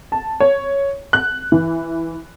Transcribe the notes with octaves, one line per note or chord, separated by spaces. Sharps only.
A5
C#5
F#6
E3